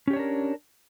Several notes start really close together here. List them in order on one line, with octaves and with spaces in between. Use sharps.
C#4 G4 C#5 D4 A#4